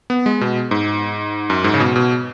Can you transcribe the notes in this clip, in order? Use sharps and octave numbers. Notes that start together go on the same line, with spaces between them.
B3
G#3
B2
G#2
F#2
G#2
C#3
B2
B2